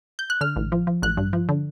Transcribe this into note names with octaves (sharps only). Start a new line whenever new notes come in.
G6
F#6
D3 F6
A1
F3
F3
A1 F#6
G2
F3
D3